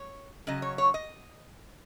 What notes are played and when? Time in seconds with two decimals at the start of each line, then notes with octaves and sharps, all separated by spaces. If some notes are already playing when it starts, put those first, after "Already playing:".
Already playing: C#5
0.47 C#3 F#3 D#5
0.62 C#5
0.78 C#5
0.94 D#5